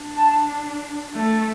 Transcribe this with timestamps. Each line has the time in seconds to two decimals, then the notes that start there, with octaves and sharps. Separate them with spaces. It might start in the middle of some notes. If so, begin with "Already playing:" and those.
Already playing: D4
0.17 A5
1.15 A3